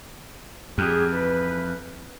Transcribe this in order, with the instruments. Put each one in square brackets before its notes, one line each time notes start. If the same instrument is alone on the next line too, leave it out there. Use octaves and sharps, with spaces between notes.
[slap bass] F2 [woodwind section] G4 G#4
[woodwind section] E3 B4